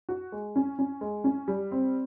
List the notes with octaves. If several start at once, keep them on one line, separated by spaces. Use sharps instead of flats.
F#4
G#3
C#4
C#4
G#3
C#4
G3
C4